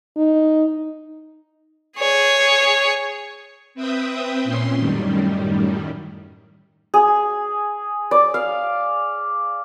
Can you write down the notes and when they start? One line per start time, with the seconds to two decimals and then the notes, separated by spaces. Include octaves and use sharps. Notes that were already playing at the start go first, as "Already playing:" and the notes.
0.17 D#4
1.99 G#4 C#5
3.74 C4 B4 E5 G5 D#6
4.44 A#2 C#4 C6
4.76 F#2 A2 D#3 G3
6.94 G#4
8.11 D5
8.34 F5